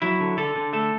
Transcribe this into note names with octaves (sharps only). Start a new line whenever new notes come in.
F#3 E4
D3
D3 A4
D3
A3 A4